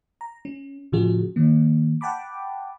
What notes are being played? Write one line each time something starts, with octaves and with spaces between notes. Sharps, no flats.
A#5
C#4
A2 C#3 F3 F4 F#4 G#4
D#3 A#3
F#5 G5 A5 B5 D6